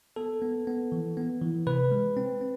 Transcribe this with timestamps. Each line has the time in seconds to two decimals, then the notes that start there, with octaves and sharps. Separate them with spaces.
0.16 B3 A4
0.42 B3
0.67 B3
0.92 E3
1.17 B3
1.41 E3
1.67 C3 B4
1.91 G#3
2.17 C4
2.41 C4